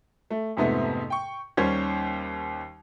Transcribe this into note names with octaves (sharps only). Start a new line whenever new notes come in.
A3
F2 G#2 C3 A3 B3
G5 C#6
D#2 G3 C#4 C5 G#6